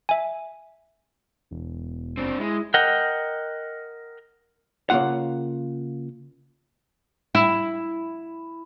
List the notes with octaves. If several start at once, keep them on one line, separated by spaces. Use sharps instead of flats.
E5 G#5
E1
F#1 C4 D4
G#3 E4
A#4 D#5 F#5 G5
C#3 E3 A#3 F4 F#5
E4